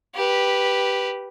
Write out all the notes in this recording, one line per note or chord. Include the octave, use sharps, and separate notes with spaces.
G4 B4